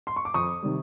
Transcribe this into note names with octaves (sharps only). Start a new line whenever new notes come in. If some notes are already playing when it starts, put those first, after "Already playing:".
C6
C#6
D6
F2 C#6 D#6
C3 D#3 G3